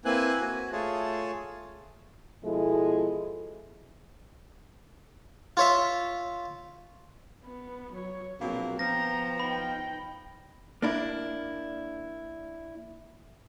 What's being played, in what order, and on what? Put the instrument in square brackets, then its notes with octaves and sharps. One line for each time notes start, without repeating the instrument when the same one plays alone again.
[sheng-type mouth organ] A#3 C4 E4 B4 G#5 F#6
F#4
A3 F4 G#4 C#5 A5
[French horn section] B2 F3 G#3 E4 A4
[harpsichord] F4 C#5 E5
[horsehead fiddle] B3
F#3 C#5
[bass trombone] A#1 [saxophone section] B2 F#3 A#3 [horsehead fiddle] C4
[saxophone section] F3 [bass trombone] B3 [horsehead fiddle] G5 A#5 [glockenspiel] A#6
[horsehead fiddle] D#4 G5 [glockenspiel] B5
[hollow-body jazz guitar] A#3 D4 E4